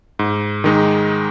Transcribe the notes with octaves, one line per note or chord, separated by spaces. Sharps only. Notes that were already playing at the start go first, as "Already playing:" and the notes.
G#2
D#3 G#3 D#4